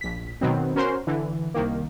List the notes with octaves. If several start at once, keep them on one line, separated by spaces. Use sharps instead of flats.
A#1 B6
B2 D#3 F#3 B3 C4
C#4 F#4 A#4 C5 C6
D3 E3
C2 D#3 A#3